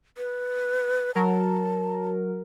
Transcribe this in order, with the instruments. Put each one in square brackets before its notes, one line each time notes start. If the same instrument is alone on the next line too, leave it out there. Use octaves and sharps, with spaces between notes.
[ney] B4
[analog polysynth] F#3 A#4 [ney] A5